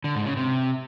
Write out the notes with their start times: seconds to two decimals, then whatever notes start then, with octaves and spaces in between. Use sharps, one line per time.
0.04 D3
0.15 G#2
0.26 C#3
0.37 C3